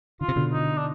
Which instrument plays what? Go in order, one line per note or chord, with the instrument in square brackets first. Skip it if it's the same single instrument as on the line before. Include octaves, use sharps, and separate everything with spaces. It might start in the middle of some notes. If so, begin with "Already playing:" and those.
[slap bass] D3 [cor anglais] F4
[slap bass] C3
B2 D3
[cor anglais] D#4
D4